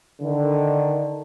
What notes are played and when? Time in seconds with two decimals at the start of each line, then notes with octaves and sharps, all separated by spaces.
0.22 D3 D#3